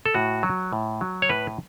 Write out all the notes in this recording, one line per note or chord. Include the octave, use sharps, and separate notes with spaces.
A4
A2 F#4
F#3
A2
F#3
C#5
A2 B4